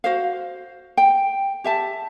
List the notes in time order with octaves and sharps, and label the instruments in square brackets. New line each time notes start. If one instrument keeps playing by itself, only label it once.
[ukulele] F#4 C5 F5
G5
G4 E5 A5